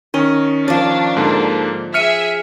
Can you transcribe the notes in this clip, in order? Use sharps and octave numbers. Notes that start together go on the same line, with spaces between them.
D#3 C#4 D#5
F3 D4 D5
G#2 D3 A#3
G#4 E5 F6 C#7 D#7